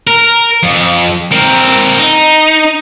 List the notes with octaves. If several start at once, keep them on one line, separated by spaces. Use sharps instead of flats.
A#4
F2
C4 A#4
D#4